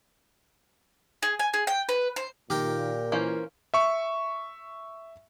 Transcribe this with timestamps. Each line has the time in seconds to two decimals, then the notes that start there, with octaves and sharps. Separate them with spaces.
1.23 G#4
1.39 G#5
1.54 G#4
1.67 G5
1.89 B4
2.16 C5
2.50 A#2 D#3 G4 A#4 G5
3.12 E3 A#3 C#4 C5
3.74 E5 C#6